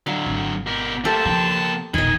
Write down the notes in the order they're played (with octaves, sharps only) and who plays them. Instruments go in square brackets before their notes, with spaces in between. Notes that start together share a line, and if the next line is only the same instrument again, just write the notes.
[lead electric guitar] D3 F#3 [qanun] F5
[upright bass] G#1
[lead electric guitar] B2 A#4 [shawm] G4
[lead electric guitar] A3 A#3 [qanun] G4 A4 C5 [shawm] A5
[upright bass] C#3 F3 [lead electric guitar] A#3 G5
[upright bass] E1 A#1 [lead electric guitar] D#3 [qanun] D#5 B5 [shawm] G#5